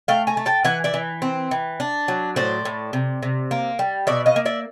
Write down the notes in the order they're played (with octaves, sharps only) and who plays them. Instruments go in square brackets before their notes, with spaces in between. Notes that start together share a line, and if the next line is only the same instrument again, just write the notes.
[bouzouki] A3 F5 G5
G#5 A#5
A3
G5 A5
E3 F#5 G#5
D5 E5
E3
C4
E3
D4
F#3
A2 C5 D5
A2
C3
C3
A#3
G3
B2 D5 E5
D#5 F5
A#3
D5 E5